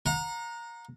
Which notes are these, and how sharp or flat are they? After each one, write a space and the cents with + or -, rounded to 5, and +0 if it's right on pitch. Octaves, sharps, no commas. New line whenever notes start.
F#5 -40 A#5 +0